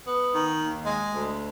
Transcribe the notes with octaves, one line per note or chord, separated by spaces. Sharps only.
B3
D#3
D#2
G#3
D2